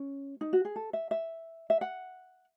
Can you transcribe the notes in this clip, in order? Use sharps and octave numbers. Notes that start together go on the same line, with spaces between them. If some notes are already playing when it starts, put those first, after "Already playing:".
Already playing: C#4
D#4
F#4
G#4
A4
E5
E5
E5
F#5